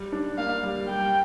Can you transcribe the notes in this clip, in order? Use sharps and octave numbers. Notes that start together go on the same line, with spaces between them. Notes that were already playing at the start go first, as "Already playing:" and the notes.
Already playing: G3
D4
A#3 F5
G3
G3 G5